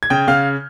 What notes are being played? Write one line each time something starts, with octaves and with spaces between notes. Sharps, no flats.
G#6
C#3 G5 G6
C#3 F5 F6